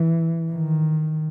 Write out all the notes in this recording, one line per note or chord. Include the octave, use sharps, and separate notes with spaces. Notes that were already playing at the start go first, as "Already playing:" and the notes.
Already playing: E3
D#3